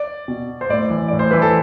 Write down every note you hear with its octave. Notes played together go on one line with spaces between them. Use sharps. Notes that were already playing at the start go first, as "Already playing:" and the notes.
Already playing: D5
B2
C5
A2 D5
E3
A2 D5
C5
E3 B4
A4